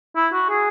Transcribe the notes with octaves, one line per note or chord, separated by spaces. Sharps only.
E4
F#4
G#4